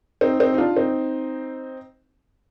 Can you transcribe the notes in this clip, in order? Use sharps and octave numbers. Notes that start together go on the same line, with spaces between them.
C4 D#4
C4 D#4
D#4
D4 F4
C4 D#4